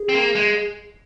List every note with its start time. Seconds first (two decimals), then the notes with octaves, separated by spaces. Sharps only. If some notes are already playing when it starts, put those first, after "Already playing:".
Already playing: G#4
0.09 C4
0.14 A#3
0.35 G#3